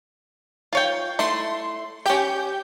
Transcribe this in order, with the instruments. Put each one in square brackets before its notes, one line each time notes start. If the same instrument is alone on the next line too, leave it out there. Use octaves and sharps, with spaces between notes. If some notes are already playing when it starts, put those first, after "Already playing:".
[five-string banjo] F4 C#5 G5
[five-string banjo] A3 E4 [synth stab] C6
[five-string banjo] C#4 G5 [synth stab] G4 G6